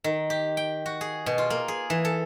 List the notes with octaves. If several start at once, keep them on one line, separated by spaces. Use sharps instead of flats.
D#3
G4
G5
F#4
G#4
B2
F4
A#3
G#4
E3
A4